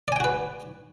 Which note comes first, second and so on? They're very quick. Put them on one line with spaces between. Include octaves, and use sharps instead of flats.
D5 G#5 G5 F#4 B4